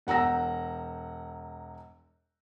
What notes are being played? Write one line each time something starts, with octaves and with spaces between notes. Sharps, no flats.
E1 F#5 A#5 E6 A#6